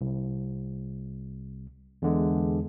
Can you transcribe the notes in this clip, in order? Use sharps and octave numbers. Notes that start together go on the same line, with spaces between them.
C2
E2 D3 G#3